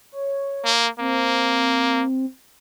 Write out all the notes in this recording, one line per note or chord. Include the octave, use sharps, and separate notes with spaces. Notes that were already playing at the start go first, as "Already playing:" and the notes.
C#5
A#3
A#3 C4